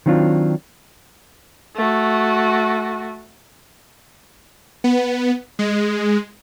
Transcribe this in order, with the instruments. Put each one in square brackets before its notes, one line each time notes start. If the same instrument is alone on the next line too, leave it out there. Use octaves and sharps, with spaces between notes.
[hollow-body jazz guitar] D#3 F#3 C4 D4 F4
[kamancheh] A3 F#4
[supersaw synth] B3
G#3